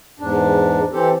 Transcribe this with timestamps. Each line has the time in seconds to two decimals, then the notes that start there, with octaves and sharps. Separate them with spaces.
0.20 E2 G#2 D4
0.92 E3 C4 G4 A4